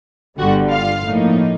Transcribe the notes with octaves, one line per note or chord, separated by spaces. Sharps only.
G1 G2 D3 G3 F#4 F#5
F4 F5
A2 F3 A#3 D#4